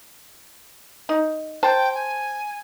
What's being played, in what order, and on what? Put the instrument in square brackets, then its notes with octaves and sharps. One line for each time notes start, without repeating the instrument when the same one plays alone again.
[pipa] D#4
[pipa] C5 A5 [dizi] G5
[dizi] G#5